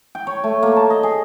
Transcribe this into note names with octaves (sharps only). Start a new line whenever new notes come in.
G5
C#5
A3
A#3
A5
D#5
G#4